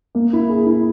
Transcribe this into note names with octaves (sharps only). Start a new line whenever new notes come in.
A#3
E4
G#4
E4